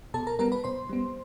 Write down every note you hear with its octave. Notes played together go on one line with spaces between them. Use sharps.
B2 A4 A5
A#4 A#5
G3 B3 A#4 A#5
B4 B5
B2 C5 C6
G3 B3